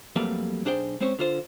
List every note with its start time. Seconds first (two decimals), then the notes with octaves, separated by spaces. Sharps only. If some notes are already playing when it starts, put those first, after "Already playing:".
0.16 F2 F#3 G3 A3 A#3 B4
0.65 B1 D4 G#4 C5 G5
1.00 G#3 C4 C#4 C5 C#5
1.19 D3 F4 C5